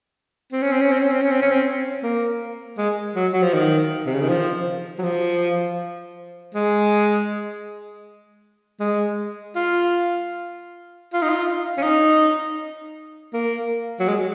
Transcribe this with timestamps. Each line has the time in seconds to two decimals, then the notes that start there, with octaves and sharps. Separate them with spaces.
0.52 C4
0.62 C#4
0.72 C4
0.81 C#4
0.92 C4
1.02 C#4
1.12 C4
1.22 C#4
1.32 C4
1.42 C#4
1.52 C4
2.03 A#3
2.78 G#3
3.16 F#3
3.33 F#3
3.42 F3
3.54 D#3
4.06 C3
4.14 C#3
4.21 D#3
4.29 F3
4.98 F#3
5.03 F3
6.54 G#3
8.80 G#3
9.56 F4
11.13 F4
11.22 D#4
11.29 F4
11.77 C#4
11.82 D#4
13.33 A#3
14.00 F#3
14.08 G#3